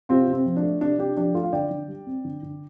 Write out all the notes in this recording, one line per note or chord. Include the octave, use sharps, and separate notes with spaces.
C3 C4 F4
C3
C4
F3
D4
A3
C3 D4
C3 D4 G4
F3 D4 G4
A3 F4 A4
F5
D3 D5 G5
D3
G3
C4
D3
D3